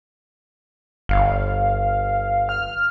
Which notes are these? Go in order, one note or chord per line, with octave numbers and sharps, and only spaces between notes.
G1 F5
F6